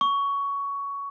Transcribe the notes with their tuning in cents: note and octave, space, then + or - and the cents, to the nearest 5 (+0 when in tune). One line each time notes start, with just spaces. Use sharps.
C#6 +15